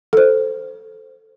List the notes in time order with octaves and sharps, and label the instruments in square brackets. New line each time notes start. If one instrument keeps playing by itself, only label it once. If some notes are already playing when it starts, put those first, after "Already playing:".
[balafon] A4 C5